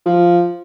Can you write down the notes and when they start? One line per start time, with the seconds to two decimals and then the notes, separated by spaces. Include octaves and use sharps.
0.06 F3